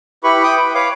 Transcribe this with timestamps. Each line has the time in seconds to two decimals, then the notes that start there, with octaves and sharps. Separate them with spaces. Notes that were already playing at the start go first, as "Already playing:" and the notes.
0.24 E4 G4 B4 B5 C#6
0.43 G5 D6 D#6
0.56 B4
0.75 B4 C#5 F5 D6